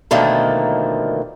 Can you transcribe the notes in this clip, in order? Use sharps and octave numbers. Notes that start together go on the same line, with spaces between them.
B2 D3 D#3 F3 A3 A#3